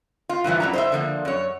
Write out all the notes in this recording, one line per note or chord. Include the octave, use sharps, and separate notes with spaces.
F4
G2 A#2 E3 F3
F#2 E4 A#5
C5 D#5 E5
D3 F3 A#3
F#2 C#5